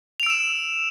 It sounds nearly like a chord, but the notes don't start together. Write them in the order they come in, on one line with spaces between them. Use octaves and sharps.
F7 D7 E6 E7